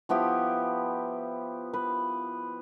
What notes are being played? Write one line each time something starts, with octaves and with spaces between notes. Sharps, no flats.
F3 B3 E4 G4
B4